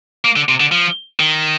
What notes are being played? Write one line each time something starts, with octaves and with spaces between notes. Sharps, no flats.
A#3
D3
C3
D3
F3
D#3